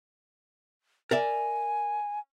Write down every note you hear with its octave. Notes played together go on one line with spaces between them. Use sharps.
A#4 D5 E5 G#5